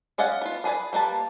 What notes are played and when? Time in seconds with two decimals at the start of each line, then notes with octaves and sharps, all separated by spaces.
0.18 C#4 D5 D#5 F5 F#5
0.41 B3 F4
0.64 D4 G#4 B4 D5 G#5
0.93 G3 A#3 B4 A5